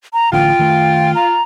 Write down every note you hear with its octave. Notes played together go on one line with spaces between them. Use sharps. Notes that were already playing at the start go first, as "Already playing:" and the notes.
A#5
A1 D3 F4 G5
D#3 A3
A#5